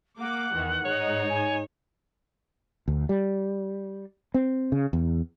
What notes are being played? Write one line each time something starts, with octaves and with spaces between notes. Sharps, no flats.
A#3 F#5 D6
E2 D#3 E3
G#2 G#3 D#4 C#5
G#5
D2
G3
C4
C#3
E2